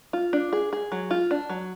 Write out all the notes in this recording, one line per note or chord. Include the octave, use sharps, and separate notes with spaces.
F4
D4
G#4
G#4
F#3
F4
D4
F#3